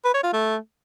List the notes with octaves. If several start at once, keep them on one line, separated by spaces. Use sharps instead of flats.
B4
C#5
F4
A3